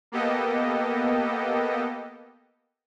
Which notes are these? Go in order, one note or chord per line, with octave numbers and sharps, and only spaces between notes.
A#3 B3 G4 A4 D#5